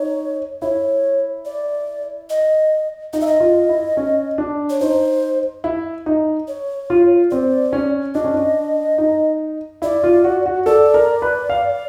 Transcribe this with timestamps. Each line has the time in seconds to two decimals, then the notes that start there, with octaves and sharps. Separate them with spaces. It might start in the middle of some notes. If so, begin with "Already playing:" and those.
Already playing: D#4 C#5
0.62 E4 C#5
1.45 D5
2.30 D#5
3.13 D#4 D#5
3.21 E5
3.27 D#5
3.40 F4
3.69 E4
3.97 C#4
4.38 D4
4.70 C#5
4.80 D#4 C5
5.64 E4
6.06 D#4
6.48 C#5
6.90 F4
7.31 C4 D5
7.73 C#4
8.15 D4 D#5
8.24 C#4
8.34 D4
8.98 D#4
9.82 E4 D5
10.04 F4
10.24 F#4
10.46 F#4
10.66 A4 D5
10.94 A#4
11.22 B4
11.50 F5